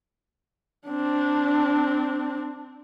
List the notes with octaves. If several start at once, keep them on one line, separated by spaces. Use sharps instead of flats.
C4 D4